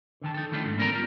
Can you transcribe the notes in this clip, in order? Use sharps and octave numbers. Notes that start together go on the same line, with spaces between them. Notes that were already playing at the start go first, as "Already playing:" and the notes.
D3 D#3 A5
D#4 A4
D#3 E3 A3 C#4 D4 F4
G#2 A3
B3 C#4 A#4 C#5 D5 A#5
G3 F4